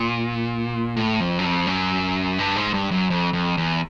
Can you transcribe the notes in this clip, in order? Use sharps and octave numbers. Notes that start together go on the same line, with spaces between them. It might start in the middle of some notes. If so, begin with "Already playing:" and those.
Already playing: A#2
A2
F2
F#2
F2
F#2
G2
G#2
G2
F#2
F2
F2
E2